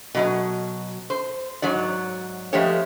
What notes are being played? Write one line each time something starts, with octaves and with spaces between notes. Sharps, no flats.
B2 F#3 D#5
C5
G#2 F#3 F#4 D5
F3 G#3 A3 B3 G4 C#5